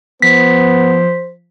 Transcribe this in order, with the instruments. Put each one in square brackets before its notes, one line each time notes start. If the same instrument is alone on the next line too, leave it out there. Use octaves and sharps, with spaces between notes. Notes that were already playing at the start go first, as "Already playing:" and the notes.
[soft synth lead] F3 [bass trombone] B3 [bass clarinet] C5 [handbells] B6